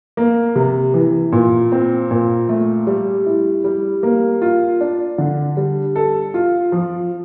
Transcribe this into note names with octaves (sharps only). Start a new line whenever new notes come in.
A#3
C3
E3
A#2
C4
A#2
A3
G3
E4
G3
A#3
F4
D4
D3
G3
A4
F4
F3